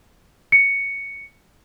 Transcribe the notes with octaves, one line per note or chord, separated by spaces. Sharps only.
C#7